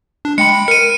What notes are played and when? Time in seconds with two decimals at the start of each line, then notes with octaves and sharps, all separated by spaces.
0.25 D4
0.38 G#3 G5 B5 C#7
0.68 A#4 C#7 D#7